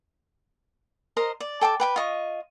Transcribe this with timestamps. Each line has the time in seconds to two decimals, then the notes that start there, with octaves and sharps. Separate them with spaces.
1.17 A#4 C5 D#5 A#5
1.40 D5
1.61 A4 G5 A5 D6
1.80 B4 G5 B5
1.96 F4 D#5 C#6